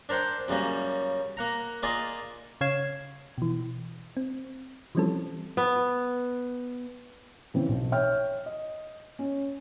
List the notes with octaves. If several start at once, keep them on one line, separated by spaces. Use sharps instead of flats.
D4 A#4 C5 F#5 G5
F#2 C#3 G3 A#3
A#3 F#5 A#5
A#3 F4 G#4 D5 D#5
C#3 C#5 F5 G#6 C7 E7
B2 E3
C4
E3 F3 G3 C4 C#4 A4
B3
C#3 E3 C4
B1
C#5 E5 G5 F6
D#5
C#4